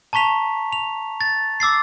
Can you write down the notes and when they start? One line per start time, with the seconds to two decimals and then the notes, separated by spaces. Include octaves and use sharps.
0.13 A5 A#5 C#6 B6 F7
0.73 F7
1.21 A6
1.60 D6 E6 A6 C7